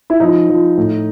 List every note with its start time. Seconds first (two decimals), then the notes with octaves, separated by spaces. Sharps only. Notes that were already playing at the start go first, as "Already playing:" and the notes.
0.10 E4
0.20 F3 D#4
0.49 F3
0.77 A2